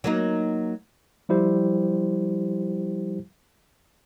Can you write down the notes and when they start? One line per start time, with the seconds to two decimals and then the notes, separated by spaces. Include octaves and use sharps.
0.04 F#3 A#3 D#4
1.29 F3 G3 E4 G4 C5